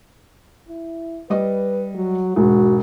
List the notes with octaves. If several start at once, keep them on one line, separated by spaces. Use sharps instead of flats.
E4
G3 B4 D#5 D6
F#3
E1 G#2 F#4